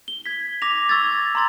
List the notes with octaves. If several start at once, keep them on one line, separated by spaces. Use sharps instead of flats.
G7
G#6 B6
D6 A#6 F7
C#6 E6 G#6 A6
A#5 C6 A6